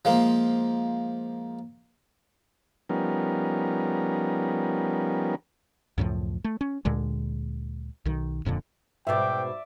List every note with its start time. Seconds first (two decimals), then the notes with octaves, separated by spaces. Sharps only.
0.05 F3 G#3 A#3
2.89 F3 G3 B3 C#4 D#4 A#4
5.98 C#2 F#2 A2 F3
6.44 A3
6.61 C#4
6.85 D2 A#2 D3 G#3
8.05 B1 D#3
8.45 D#1 F2 A#2 D3
9.07 G#2 B2 D5 E5 G5